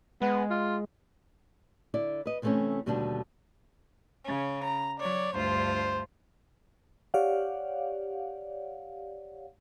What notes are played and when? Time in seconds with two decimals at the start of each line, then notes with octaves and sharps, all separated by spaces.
0.22 G#3 B3
0.50 F4
1.94 D3 E4 D5
2.26 B4 D#5
2.42 C3 E3 G3 A3 C4 C#4
2.86 D#2 B2 D3 G3 A3 D4
4.24 C#3 C#4
4.63 A#5
4.99 F#3 C#5 D5
5.33 D2 G2 F4 C5
7.14 G4 C#5 D5 F5 F#5